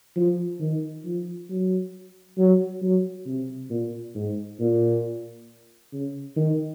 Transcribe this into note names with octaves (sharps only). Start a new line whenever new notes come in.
F3
D#3
F3
F#3
F#3
F#3
C3
A#2
G#2
A#2
C#3
D#3